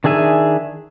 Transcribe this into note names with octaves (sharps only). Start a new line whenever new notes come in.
D#3 D4 G#4 E5 G#5